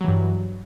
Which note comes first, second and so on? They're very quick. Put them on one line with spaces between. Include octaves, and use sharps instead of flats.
F#3 E3 G2